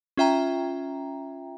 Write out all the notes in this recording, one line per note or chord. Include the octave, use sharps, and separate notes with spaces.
C#4 F4 E5 G5 A#5